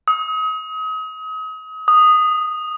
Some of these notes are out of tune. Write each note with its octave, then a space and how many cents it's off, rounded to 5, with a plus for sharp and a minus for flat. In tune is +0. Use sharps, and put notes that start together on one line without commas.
D#6 +35
D#6 -5